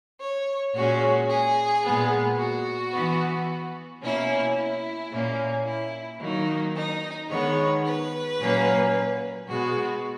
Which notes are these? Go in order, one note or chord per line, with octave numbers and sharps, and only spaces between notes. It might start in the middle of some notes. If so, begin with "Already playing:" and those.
C#5
A#2 G#3 C#4 F#4
G#4
A#2 G#3 B3
F#4
E3 B3
B2 A#3 C#4 E4
E4
A#2 A#3 C#4
E4
D#3 F#3 A#3 D#4
D#4
D#3 G#3 B3 C#5
B4
A#2 F#3 A#3 C#4
B2 G#3 B3 F#4